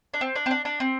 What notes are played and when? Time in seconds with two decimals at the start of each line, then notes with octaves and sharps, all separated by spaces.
0.14 D4
0.21 C4
0.35 D4
0.46 C4
0.51 D4
0.65 D4
0.80 C4